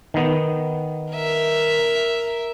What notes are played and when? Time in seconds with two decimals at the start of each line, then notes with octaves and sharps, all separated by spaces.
0.14 D#3 B3
1.12 A#4 E5